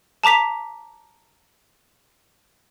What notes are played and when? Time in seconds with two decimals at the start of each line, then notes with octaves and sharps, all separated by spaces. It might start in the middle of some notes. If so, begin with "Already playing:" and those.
0.24 A5 A#5 D6 B6 F7